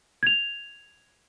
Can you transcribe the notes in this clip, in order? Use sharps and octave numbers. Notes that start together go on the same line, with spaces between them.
G#6 F7